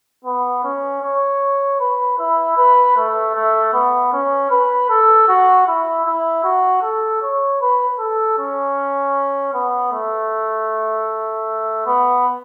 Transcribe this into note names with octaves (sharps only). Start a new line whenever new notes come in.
B3
C#4
C#5
B4
E4
B4
A3
A3
B3
C#4
B4
A4
F#4
E4
E4
F#4
A4
C#5
B4
A4
C#4
B3
A3
B3